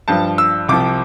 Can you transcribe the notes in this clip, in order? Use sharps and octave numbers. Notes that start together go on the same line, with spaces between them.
G2 F3 A5
E6
C2 C3 F3 D6